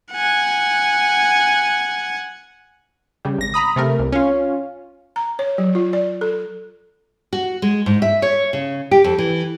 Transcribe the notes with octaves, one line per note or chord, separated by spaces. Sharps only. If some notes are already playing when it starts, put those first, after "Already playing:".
F#5 G#5
C#3 G3
G#1 A#6
A#5 B5 D#6
C3 A3 A#4
C2
C#4 F4
A#5
C#5
F#3
F4
D5
A4
F#4
G#3
G#2
E5
C#5
C#3
G4
F2
E3